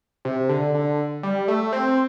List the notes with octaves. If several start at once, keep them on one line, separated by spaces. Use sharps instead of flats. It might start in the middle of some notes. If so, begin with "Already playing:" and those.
C3
D3
D3
G3
A3
C4